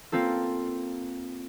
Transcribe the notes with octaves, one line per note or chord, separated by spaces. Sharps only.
A#3 C4 F4 A4